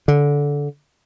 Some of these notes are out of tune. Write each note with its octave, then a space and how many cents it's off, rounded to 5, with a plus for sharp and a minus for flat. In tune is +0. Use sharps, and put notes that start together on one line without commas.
D3 -20